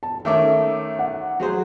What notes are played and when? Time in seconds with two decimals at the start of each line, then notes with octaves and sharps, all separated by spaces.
0.03 A5
0.25 D#3 A3 C#4 E5 D6
0.99 F#5
1.40 F#3 G#4 C5